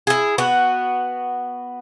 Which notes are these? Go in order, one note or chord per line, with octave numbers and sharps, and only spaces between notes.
E4 G#4
B3 F#4